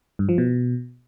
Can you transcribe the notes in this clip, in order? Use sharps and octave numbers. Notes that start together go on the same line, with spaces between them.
G2
F3
B2